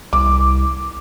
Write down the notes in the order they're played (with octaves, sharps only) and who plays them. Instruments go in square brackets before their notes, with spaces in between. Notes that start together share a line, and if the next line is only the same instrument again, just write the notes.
[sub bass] C2 [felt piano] D6